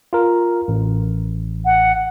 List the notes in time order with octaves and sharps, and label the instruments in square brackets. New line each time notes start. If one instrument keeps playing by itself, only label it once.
[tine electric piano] F4 A#4
A1
[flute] F#5